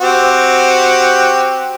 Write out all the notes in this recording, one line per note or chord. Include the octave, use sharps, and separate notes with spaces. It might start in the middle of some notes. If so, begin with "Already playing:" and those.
C4 F#4 G4